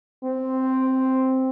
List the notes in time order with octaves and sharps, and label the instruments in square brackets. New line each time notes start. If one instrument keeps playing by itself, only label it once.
[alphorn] C4